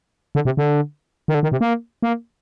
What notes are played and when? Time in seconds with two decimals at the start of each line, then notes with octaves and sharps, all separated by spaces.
0.35 D3
0.45 C3
0.57 D3
1.28 D#3
1.34 D3
1.43 D#3
1.52 C3
1.61 A#3
2.02 A#3